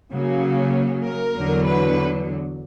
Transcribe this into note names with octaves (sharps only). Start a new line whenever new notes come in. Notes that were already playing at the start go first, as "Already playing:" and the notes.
C#3 F#3 A#3 C#4
A#4
E2 D3 F#3
B4